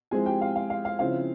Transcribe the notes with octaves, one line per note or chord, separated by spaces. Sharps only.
F3 G#3 C4 E4 G#4 G#5
G4 G5
F5
F5
F5
F5
C#3 F3 C4 E4 F5